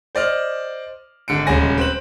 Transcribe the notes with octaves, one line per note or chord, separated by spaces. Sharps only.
C5 D5 D#5 F6
G#1 D3 C#7 D7
D#1 C#3 G#3 C#4 G#5 A#6
C4 B4 F#7